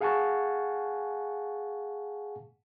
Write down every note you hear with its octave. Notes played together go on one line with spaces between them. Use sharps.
G#4 F5 F#5 G#5 A5 C#6